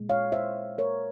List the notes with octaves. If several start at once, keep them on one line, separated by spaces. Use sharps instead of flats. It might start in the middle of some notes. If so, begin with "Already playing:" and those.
Already playing: A#2 G#3
C#5 F5
C5 E5
A#4 C#5